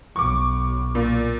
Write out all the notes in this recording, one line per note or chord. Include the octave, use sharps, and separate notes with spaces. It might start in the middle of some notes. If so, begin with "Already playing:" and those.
B1 C#6 D6
A#2